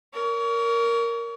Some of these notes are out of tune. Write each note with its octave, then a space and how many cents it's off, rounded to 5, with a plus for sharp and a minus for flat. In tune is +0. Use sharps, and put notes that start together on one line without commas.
A#4 +0 C#5 +35